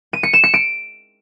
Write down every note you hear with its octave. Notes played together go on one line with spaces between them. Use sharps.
D#7
C#7
E7
C#7
D7